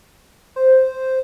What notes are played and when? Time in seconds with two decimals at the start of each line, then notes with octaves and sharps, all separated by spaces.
0.56 C5